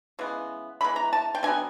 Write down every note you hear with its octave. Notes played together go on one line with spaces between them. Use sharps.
C#3 E3 G#3 B3
C3 E3 G#3 B3 B5
A#5
A5
G5
D3 F#3 B3 G#5